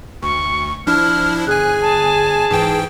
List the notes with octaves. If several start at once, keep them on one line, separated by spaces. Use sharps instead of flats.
D2 C#6
F3 D4 E4 F6
G1 G#4 G#5 F#6
A5
G#2 E3 G5